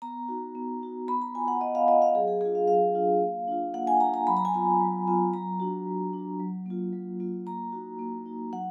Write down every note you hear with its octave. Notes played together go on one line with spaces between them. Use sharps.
B3 A#5
D#4 F#4
B3
D#4 F#4
B3 B5
A#5
F4 G#5
F#5
B3 D#5
F5
F4 D#5
F5
F#3 G#4
G#4
D4 F4 G#4
F5
F#3 F5
D4 F4
A#3
D4 F4
A#3 F#5
G#5
D4 A#5
F4
A#5
F#3 B5
A#5
G#5
B3 F4 A#5
F#3
B3 F4
F#3 A#5
D4 F#4
F#3
D4
F#4
F#3
A#3 F4
F#3
A#3 F4
A#3 A#5
D#4 F#4
A#3
D#4 F#4
F#3 F#5